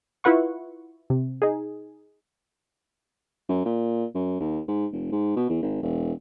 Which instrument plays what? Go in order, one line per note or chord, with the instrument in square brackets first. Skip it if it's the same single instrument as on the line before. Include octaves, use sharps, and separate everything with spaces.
[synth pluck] E4 F4 B4 F#5 C#6
C3
D#4 G#4
[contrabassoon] F#2
A#2
F#2
D#2
G#2
F1
G#2
B2
E2
G#1
E1